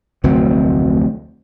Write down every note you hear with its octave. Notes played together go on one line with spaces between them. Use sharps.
F1 D2 F#3 C4